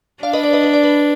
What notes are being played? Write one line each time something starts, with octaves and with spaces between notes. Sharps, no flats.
D4 D5 F5
B4 D#5
D5
B4 D#5
B4
D5
B4